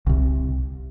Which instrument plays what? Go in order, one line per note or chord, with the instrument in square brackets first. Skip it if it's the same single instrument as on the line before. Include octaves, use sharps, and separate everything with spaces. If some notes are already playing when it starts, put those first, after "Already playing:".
[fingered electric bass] C2 C3